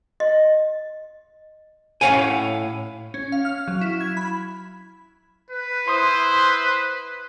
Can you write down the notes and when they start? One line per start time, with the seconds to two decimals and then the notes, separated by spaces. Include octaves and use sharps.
0.20 D#5
2.01 A2 C#4 C#5 F5 F#5 G#5
3.14 C#4
3.32 F5
3.45 F6
3.68 F#3
3.81 E4
4.01 G#6
4.17 B5
5.50 B4
5.88 E4 C5 C6 D#6